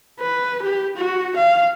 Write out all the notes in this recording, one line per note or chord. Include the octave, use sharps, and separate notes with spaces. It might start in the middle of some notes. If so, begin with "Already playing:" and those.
B4
G4
F#4
F5